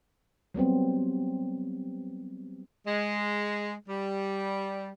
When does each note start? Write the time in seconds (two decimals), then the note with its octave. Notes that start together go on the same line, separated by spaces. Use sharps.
0.54 F#3 G3 B3 C4
2.86 G#3
3.88 G3